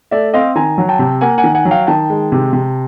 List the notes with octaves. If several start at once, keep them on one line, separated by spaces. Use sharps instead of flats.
A3 D5 E5
C4 D#5 F5
D#3 G#5 A#5
F#3
G5 A5
C3
A#3 F#5 G#5
F#5 G#5
D#3
F#5 G#5
F#3
F5 G5
D#3 G5 A5
G#3
C3
C3